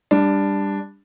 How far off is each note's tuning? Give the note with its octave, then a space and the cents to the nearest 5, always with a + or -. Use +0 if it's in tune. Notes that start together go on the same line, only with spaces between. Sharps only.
G3 +20 D4 +0